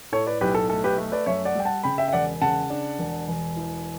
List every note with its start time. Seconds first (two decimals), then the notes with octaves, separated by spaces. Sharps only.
0.12 A2 A4 C#5
0.27 B4 D5
0.41 B1 G4 B4
0.55 A4
0.69 A3 A4
0.84 G4 B4
0.98 A3
1.12 B4 D5
1.26 F#2 C#5 E5
1.45 D5 F#5
1.55 G3 G5
1.65 F#5 A5
1.84 C#3 G5 B5
1.98 E5 G5
2.08 E5
2.13 E1 D5 F#5
2.41 C#3 F#5 A5
2.70 D4
2.99 E1
3.28 E1
3.56 E3